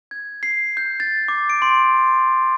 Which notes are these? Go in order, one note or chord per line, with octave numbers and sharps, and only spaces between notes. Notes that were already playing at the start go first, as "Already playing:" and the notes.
G#6
C7
G6
A6
D6
D7
C6